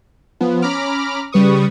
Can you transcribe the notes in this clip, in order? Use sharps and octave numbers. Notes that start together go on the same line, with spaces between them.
F3 B3
C#4 A#5 B5 D6 F6
C#3 G3 B4 C#6 D#6